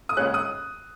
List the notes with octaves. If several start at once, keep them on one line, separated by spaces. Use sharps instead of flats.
D#6
C#2 C#3 G#3 C#4 F#6
D#6